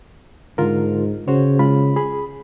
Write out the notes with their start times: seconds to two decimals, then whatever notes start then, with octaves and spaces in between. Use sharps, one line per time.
0.58 G#2 D3 F4 A#4
1.28 C#3 F#4 C5 C#5
1.59 G#3 F4 B5
1.96 G#4 B5